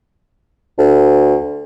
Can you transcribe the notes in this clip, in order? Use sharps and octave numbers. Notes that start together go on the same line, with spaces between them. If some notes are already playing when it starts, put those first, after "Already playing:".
D2